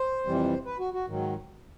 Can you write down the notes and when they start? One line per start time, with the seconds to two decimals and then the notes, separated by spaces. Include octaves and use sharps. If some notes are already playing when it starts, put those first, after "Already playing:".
Already playing: C5
0.26 F2 C3 E3 G3
0.66 B4
0.79 F#4
0.94 F#4
1.07 G#2 D#3 F#3